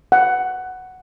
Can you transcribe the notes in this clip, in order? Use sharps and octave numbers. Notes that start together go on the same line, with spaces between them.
F#5